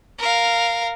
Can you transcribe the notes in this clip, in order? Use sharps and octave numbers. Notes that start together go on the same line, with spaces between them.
A#4 F5